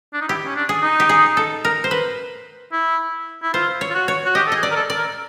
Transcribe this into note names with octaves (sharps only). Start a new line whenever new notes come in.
D4
D#4
E4 G4
C#4
D4
G#4
D#4
G4
G#4
A4
A#4
C5
B4
E4
E4
F4 C5
C#5
F4
F#4
C#5
F#4
G4 D#5
A4
G#4 D#5
D5
A#4
A4
D5
A#4